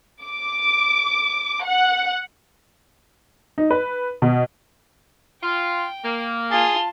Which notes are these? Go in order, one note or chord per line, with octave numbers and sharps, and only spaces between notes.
D6
F#5
D#4
B4
B2
F4 G5
A#3
F4 G#4 A5 C6